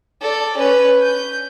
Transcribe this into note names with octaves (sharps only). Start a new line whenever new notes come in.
A4 D5
C#4 B4
G6